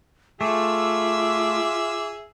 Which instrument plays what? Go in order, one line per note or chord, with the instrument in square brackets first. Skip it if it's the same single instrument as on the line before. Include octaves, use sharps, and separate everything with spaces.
[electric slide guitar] A3 [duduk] F4 [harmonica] G#4 E5 E6 [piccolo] D6